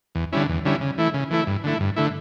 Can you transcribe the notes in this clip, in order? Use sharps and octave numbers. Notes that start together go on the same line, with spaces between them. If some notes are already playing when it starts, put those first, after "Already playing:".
E2
D3 G3 C#4 E4
E2
D3 G3 C#4 E4
C#3
E3 A3 E4
C#3
E3 A3 E4
G2
D3 A3 E4
G2
D3 A3 E4